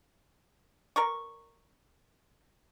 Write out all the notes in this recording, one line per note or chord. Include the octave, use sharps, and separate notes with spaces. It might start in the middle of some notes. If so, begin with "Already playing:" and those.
A#4 D5 C#6